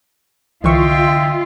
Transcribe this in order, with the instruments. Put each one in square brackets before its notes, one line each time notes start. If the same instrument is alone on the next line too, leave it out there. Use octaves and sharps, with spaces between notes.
[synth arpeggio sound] C2 E3 C#6 [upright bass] D3 [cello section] F4 [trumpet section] D#5 E5 G5